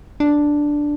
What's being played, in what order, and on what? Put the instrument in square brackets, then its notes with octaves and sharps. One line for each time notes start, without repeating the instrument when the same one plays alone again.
[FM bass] D4